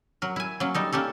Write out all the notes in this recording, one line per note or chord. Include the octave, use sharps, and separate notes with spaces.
F#3 A#4
E4 G#5
F#3 A#3 C#4
G3 D#4 A4
A#3 C#4 G4 A4